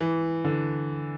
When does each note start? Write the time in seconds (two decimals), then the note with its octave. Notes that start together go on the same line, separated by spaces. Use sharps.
0.01 E3
0.44 D3